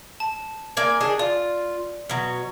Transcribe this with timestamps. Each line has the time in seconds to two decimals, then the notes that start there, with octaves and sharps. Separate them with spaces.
0.20 A5
0.77 A#3 D5 G#5
1.01 D4 D#4 G#4
1.19 F4 D5
2.10 B2 F#3